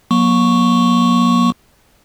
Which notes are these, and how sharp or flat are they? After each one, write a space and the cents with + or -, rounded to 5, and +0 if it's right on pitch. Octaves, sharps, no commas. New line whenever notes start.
F#3 -25 A#3 +40 C#6 +0